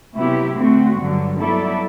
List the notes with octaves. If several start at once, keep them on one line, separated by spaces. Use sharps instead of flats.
C3 F#3 B3 E4 G4
D3 A3 C4 F#4
G2 D3 F#3
F#3 B3 E4 A4 D5